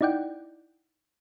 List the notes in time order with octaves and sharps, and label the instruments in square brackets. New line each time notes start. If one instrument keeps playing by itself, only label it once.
[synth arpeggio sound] D#4 E4 D5 F#5 G5